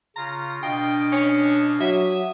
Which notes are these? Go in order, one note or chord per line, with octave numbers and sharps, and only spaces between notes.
C#3 F4 A#5
B2 D4 D#5 F5 G5
C#4
F#3 E5 D#6